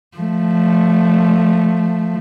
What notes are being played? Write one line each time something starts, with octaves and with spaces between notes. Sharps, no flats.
F3 A3